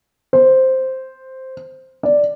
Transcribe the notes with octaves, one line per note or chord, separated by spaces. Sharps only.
C5
D5